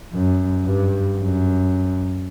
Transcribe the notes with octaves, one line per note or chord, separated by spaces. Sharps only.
F#2
G2
F#2